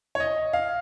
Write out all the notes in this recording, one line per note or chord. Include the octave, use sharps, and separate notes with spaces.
C#5
D#5
F5